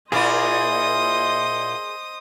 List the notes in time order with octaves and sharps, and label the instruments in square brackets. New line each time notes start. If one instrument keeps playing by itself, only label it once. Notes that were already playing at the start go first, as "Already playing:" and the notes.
[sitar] A#2 E4 [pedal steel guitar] G#4 A#4 D5 [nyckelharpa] C5 D#5 [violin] D#6